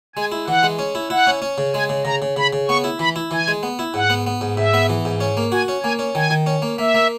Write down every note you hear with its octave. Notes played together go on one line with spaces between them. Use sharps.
G#3 G#5
E4
E3 F#5
G#3
C#4
E4
E4 F#5
C#4
C#4
C#3
G#3 G#5
C#3
C#3 A#5
C#3
C#3 B5
C#3
B3 C#6
E4
E3 B5
E4
E3 G#5
G#3
B3
E4
G#2 F#5
B3
B3
G#2
G#2 E5
B3
E3
G#2
C#4
A#3
F#4 G#5
C#4
A#3 G#5
C#4
D#3 G#5
D#3
C#4
A#3
A#3 E5
A#3